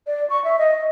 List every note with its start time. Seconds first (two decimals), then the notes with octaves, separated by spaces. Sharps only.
0.07 D5
0.30 C#6
0.44 E5
0.59 D#5